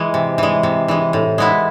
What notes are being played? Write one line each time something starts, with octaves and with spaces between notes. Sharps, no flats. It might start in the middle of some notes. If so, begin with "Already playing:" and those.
Already playing: E3 G#3
C3
E3 G#3
C3
E3 G#3
A2
G#3 B3 E4